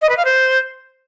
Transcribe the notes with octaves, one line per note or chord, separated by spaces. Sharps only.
D#5
B4
F5
C5